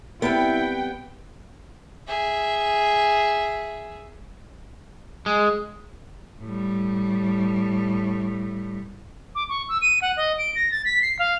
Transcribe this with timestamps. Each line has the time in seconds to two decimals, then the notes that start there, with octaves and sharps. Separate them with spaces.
0.22 C3 G3 B3 E4 A#4 G5
2.08 G#4 E5
5.26 G#3
6.42 A2 G3
9.35 D6
9.49 C#6
9.69 E6
9.82 D#7
10.02 F#5
10.17 D#5
10.38 D7
10.55 A#6
10.72 A6
10.85 B6
11.02 C7
11.19 F5